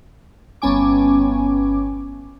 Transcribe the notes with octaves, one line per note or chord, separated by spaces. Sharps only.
G1 B3 C#4 G#5 D6